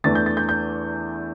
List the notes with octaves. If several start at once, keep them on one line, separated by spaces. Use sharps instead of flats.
E2 E3 A3 D4 A6
G6
A6
G6
G6